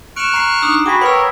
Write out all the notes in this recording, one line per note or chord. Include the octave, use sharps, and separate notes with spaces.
C#6 F6 F#6 D7 E7
A#5 C7
D4 D#4 D#6
F#4 G#4 G5 B5 D6 B6
A#4 B4 C#5 F#5 G5 B5 E6